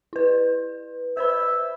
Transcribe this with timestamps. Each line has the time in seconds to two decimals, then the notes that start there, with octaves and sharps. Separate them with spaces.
0.13 E4 B4
1.17 B4 C5 E5 B5